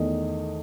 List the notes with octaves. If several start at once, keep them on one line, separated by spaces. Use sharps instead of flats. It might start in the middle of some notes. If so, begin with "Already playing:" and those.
Already playing: E2 D#3 A3 D#5